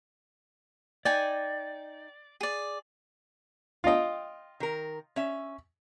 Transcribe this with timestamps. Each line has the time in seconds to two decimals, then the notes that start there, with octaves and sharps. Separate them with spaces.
1.05 D#4 D5 G5 G#5
2.41 G#4 D5
3.84 F4 D#5 F5 G5
4.60 D#3 A#4
5.16 C#4 E5